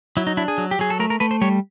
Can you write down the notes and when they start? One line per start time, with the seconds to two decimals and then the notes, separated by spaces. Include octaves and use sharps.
0.17 F#3 E4
0.27 D#4
0.37 D4 E4
0.48 G#4
0.58 F#3
0.71 G4
0.79 F#3 G#4
0.90 A4
1.00 A3 A#4
1.10 A#4
1.20 A3 B4
1.31 C5
1.41 G3 C#5